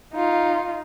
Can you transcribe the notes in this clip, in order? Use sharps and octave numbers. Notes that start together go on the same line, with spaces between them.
D#4 F4